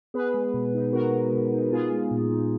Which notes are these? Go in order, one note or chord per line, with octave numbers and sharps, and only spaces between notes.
B3 G#4 B4
G#3
B2
D#4
B3 F#4 A#4
G#3
B2
D#4
B3 F4 G#4
G#3
A#2
D#4